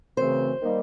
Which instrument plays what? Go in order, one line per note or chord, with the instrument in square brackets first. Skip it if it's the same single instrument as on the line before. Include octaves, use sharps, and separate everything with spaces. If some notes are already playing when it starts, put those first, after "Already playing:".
[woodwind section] F#2 C#3 E3 A3 C4 [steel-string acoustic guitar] C5
[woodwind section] D#3 G3 A#3 D#4